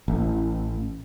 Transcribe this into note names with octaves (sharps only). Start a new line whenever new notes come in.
A1